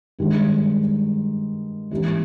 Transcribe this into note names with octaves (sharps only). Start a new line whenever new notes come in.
G2 D#3 G#3
G#2 E3 G3 A#3 C#4